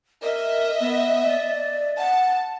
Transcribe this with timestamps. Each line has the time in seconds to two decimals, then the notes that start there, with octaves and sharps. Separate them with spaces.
0.23 A#4 D#5 E5
0.81 B3
1.28 D5
1.99 F#5 A5